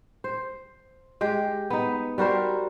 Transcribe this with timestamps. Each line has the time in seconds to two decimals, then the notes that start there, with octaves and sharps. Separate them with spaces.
0.24 C5
1.21 G#3 G4
1.70 B3 D#4
2.18 G3 F#4 A#4 C5